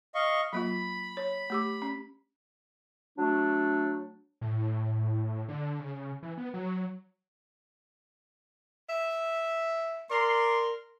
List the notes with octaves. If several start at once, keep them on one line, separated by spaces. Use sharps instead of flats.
D#5 F5 C#6
F#3 A#3 F4 B5
C#5
A3 G4 D6
C#4
F#3 A3 D4
A2
D3
C#3
E3
B3
F#3
E5
A#4 D5 C6